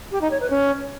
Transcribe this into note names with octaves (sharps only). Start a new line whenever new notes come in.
G4
D#4
C#5
B4
C#4